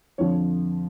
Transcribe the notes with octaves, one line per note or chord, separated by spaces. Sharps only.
F2 D3 F3 C#5